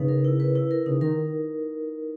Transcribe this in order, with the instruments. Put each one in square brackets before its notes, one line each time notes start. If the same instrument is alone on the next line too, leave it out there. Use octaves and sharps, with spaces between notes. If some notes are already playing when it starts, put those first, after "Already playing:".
Already playing: [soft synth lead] C#3 [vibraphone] D#4 B4
[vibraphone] A#4
E4
B4
E4
A#4
[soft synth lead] C#3 [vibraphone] D#4
[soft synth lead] D#3 [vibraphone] A#4